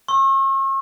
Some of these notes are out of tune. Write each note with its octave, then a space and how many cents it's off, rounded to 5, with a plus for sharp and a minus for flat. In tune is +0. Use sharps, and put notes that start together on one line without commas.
C#6 -40 E6 +5